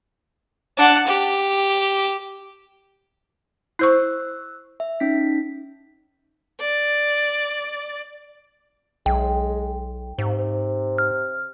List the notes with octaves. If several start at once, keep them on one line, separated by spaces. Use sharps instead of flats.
D4 F#5
G4
E4 C5 C#6 E6 F#6
E5
C#4 D#4 B6
D5
B1 G#3 G5
G#2 C3
F6